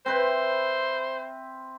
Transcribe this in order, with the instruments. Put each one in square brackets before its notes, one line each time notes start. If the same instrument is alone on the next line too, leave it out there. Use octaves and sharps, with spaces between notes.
[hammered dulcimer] C4 B4 E5 [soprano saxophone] C5